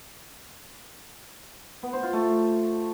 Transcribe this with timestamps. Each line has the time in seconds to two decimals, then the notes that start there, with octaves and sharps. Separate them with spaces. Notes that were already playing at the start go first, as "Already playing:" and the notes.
1.83 B3
1.93 C5
2.03 F4
2.13 A3